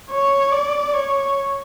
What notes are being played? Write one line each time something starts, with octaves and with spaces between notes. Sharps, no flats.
C#5
D5
C#5